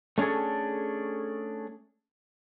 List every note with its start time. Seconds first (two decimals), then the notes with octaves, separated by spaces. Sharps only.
0.18 A3 C#4 D4 G#4 A4